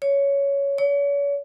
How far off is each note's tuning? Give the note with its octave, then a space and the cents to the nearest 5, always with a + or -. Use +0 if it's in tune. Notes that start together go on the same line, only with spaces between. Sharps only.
C#5 +10
C#5 +40